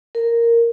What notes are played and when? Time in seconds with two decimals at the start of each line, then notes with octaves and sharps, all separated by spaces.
0.15 A#4